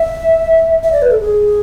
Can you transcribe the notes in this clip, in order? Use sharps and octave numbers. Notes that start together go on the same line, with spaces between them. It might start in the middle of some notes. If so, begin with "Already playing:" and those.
Already playing: E5
E5
D5
B4
A4
G#4